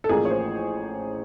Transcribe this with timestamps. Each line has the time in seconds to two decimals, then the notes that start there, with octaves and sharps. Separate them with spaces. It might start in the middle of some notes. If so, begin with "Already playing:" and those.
0.04 A4
0.09 A1 A2 F3 A#3 G#4
0.25 C#5
0.31 C5